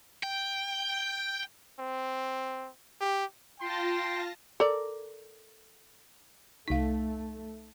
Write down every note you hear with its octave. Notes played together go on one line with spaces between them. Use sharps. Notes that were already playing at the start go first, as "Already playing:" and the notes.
G5
C4
G4
F4 G5 A5 C6 A#6
A4 A#4 D5
C2 A3 D#4 F5 B6